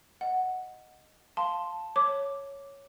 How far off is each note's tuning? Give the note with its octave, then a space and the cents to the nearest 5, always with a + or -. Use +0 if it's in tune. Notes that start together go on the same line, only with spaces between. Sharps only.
D#5 +0 F#5 +0
F5 +0 A5 +0 C6 +0
C#5 +0 D6 -5